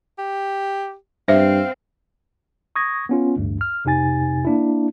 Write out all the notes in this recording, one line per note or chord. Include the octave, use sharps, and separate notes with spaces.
G4
G2 C4 C5 E5 F5
C#6 D#6 G#6 A#6
B3 C#4 F4
A1 D2 G2
F6
F2 C3 D#4 G#5 A6
A#3 D4 E4